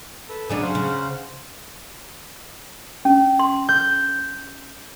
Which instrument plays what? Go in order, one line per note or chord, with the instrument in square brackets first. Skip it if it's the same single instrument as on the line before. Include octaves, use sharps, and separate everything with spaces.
[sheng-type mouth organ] A4 B4
[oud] C#3 F#3 D4 [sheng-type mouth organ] G#4 D#6
[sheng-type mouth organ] C5 F5 F#5
[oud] C#3
[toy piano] C#4
C6
[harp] G6